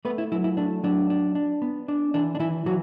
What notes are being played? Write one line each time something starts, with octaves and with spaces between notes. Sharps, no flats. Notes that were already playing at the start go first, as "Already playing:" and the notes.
A3 B3 B4
E4
F#3 E4
E4
A3 D4
F#3 D4
D4
D4
B3
D4
E3 D4
D4
E3 E4
E3 F#3 F#4